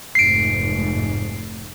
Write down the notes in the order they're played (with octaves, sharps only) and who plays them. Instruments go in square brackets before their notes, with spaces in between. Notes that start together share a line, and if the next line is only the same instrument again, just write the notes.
[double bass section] F1 G#2 A3 [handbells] C7 D7